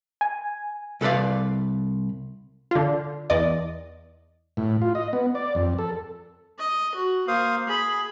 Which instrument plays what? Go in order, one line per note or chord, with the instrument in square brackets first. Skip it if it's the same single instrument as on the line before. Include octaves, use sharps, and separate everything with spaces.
[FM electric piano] G#5
[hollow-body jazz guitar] C2 A4 B4 D5 F5
[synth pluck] D3 F4
E2 D5 D#5
[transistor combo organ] A2
F4
D#5
B3
D5
F2
A4
[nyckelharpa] D#5
F#4
[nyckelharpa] A#3 [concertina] C5 F5 D#6
[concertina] G#4 [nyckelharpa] B5